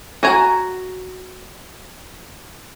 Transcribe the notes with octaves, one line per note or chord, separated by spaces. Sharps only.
F#4 G#5 A#5